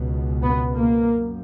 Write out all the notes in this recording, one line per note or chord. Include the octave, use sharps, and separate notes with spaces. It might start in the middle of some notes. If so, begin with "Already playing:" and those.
Already playing: C#2 B2
B3
A#3
F#2